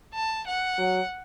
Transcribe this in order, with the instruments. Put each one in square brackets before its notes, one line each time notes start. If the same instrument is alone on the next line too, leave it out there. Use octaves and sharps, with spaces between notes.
[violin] A5
F#5
[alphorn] F#3